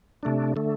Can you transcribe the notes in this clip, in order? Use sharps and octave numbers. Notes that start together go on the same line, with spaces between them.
C3 A3 D4
D3 A3